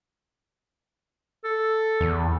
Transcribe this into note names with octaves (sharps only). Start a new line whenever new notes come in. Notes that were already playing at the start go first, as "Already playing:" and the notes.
A4
E2